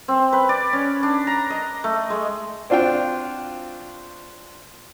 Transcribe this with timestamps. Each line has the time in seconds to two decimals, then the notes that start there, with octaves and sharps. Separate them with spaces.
0.08 C4
0.33 B4
0.49 D5
0.73 C#4
1.03 D4
1.27 A#5
1.50 D#5
1.84 A3
2.10 G#3
2.70 C4 D4 F4 F#4 G5